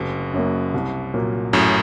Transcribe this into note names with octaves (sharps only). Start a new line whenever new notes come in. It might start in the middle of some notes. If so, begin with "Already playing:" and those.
Already playing: F#1 A2 C3
F#2 F#3 A#3
C2
A#2 F#3 A#3
A1 F#2 A2